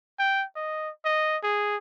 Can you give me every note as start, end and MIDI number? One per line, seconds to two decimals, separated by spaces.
0.19 0.44 79
0.56 0.90 75
1.05 1.37 75
1.43 1.77 68